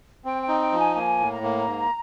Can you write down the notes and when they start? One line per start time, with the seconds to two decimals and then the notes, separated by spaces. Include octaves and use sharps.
0.25 C4 G5
0.42 G5
0.48 D#4
0.60 G5
0.73 F3
0.78 G#5
0.95 A#3 G#5
1.20 A2
1.31 A#5
1.43 A#3
1.67 G#2